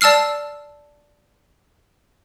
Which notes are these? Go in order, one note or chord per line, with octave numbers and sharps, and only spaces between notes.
D5 A5 E6 F6 C7